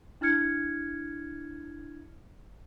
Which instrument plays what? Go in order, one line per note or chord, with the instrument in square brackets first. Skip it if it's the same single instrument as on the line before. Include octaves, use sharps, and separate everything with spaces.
[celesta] D4 E4 F6 G#6 C#7